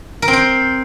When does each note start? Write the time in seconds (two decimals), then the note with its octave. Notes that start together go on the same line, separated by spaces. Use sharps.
0.22 A#4
0.28 C4
0.33 C5